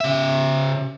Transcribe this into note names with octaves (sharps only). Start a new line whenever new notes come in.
C#3 E5